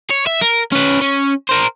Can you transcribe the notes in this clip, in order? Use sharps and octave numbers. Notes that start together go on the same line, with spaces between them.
C#5
E5
A#4
C#4 B4
C#4
A#4 C5